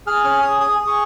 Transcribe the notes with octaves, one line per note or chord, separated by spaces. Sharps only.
G#4 F6
C#4 F6
G#4 D#6
G#4 D#6
G#4
C#6